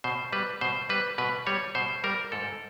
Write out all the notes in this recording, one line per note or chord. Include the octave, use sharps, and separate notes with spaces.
B2 C5
G3 B4
B2 C5
G3 B4
B2 B4
G3 C#5
B2 C5
G3 A#4
G#2 A4